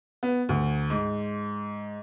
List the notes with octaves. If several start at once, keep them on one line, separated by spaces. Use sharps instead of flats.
B3
D2
G#2